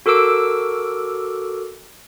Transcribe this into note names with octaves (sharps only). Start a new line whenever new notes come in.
F#4 A4 A#4 D6 E6 D7